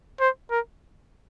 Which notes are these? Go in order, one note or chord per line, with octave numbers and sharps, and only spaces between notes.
C5
A#4